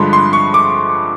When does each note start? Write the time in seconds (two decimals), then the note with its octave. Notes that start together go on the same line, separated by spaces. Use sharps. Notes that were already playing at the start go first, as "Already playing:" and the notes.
Already playing: G2 D3 F3 G#3 B5 C6
0.13 C6
0.33 C#6
0.54 D6